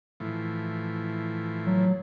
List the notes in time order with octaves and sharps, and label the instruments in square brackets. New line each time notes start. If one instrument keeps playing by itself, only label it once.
[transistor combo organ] A2 E3 F3
[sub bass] F#3